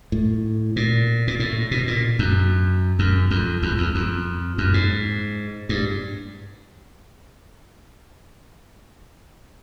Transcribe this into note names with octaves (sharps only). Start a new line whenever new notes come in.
A2
A#2
A#2
A2
B2
A#2
F#2
F#2
F2
E2
E2
F2
F#2
G#2
G2